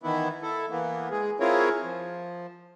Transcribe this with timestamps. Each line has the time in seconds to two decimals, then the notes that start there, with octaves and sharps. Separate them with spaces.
0.03 D#3 E3 B3 E4
0.42 E4 A4
0.70 E3 A#3 B3
1.11 G#3 G#4
1.40 C4 E4 F4 G#4 A#4 C#5
1.84 F3